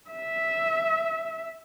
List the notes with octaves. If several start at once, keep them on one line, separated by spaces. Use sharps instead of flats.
E5